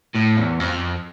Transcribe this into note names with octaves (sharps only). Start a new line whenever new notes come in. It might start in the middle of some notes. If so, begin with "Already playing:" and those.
A2
E2
F2